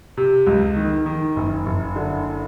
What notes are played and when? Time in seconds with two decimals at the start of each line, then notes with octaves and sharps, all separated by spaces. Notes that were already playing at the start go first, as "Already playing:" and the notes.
0.17 C3
0.47 C#2
0.76 D#3
1.06 D#3
1.36 F#1
1.66 F#1
1.96 D3